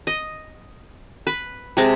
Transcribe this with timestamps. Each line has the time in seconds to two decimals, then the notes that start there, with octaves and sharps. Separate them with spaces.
0.07 D#5
1.27 B4
1.77 C3 G#3 A5